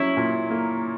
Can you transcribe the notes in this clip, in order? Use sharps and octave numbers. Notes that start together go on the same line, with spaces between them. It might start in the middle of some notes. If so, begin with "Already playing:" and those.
Already playing: F#3 C#4 E4
A#2
A#3